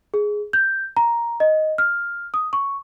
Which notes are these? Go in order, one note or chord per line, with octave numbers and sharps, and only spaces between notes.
G#4
G6
A#5
D#5
F6
D#6
C#6